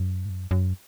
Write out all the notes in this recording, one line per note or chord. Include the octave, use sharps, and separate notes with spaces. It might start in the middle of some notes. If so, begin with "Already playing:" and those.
Already playing: F#2
G#2
F#2
F#2